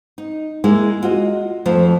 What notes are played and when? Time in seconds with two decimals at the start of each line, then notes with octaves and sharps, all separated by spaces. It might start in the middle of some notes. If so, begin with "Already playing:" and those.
0.18 D#4
0.64 G#3 A#3 E4
1.03 F4 F#4 D#5
1.66 F2 F3 A3 C5